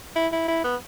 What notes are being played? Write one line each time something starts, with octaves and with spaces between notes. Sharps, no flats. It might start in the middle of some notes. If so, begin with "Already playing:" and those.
E4
E4
E4
B3